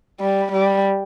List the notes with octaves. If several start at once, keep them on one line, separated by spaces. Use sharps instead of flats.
G3
G3